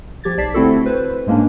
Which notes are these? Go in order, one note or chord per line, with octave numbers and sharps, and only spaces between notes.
F3 G4 G#6 A6
B1 D5 A5 B6 C7
D3 A3 C4 E4 F#4 A4
B4 C5
G#2 G#3 A#3 C#4 D4